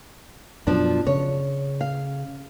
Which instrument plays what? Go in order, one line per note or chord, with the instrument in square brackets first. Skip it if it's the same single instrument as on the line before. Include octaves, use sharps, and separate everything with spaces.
[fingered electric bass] F#2 B2 [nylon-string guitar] F3 D4
[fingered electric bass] C#3 [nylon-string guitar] C#5
[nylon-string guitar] F5